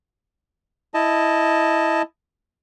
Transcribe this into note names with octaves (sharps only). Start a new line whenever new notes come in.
E4 D#5 A5